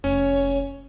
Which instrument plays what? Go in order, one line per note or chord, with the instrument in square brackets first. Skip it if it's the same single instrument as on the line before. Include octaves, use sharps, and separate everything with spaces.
[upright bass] F1 [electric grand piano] C#4 [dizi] C#5